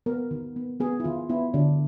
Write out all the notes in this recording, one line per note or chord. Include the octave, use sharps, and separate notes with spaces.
B3 A#4
D#3
B3
B3 G#4
E4
D#3 F4
B3 E4
D3 D4